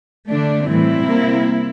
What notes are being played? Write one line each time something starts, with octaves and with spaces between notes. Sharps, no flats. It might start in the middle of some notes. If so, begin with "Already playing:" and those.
D3 A3 D4
A2 E3 G3 C4 E4
C3 G3 A#3